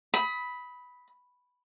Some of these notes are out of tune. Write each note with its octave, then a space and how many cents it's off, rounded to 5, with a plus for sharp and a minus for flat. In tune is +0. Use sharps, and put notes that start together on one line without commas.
B5 +0 D#6 +35